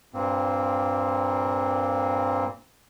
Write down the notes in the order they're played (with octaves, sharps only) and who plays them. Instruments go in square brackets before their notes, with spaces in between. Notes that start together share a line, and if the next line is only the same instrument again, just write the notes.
[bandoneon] G2 A#2 A#3 C4